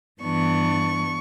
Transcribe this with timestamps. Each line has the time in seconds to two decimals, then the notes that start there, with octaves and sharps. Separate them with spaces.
0.21 G2 E3 B3 D4 C#6